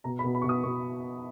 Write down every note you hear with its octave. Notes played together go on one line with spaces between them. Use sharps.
B2 A#5
B5
B2
B5
B2 C#6
D#6
B2 C#6